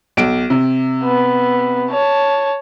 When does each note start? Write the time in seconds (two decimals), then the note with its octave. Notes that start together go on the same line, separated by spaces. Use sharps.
0.17 B1 D7
0.50 C3
1.04 B3
1.91 C#5 A5